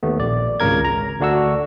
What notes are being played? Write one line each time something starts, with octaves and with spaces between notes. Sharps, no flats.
D#2 A3 B3
A#1 D5
G#1 C#2 C#3 A#4 G#6
A#5
D2 A3 D4 F#4 C#6 E6